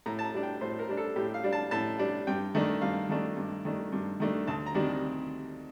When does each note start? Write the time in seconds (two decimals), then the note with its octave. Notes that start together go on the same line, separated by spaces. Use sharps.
0.06 A2 A#5
0.19 A5
0.24 A#5
0.34 G3 D4
0.43 G5
0.61 A2 C5
0.79 A#4
0.88 G3 D4
0.97 A4
1.16 A2 G4
1.34 F5
1.43 G3 D4
1.53 A5
1.71 A2 A5
1.99 G3 D4
2.27 G2 G5
2.55 D#3 A3 D4
2.81 G2 F5
3.09 D#3 A3 D4
3.36 G2
3.65 D#3 A3 D4
3.92 G2
4.20 D#3 A3 D4
4.47 D2 A5
4.66 A#5
4.75 C3 D#3 G3 D4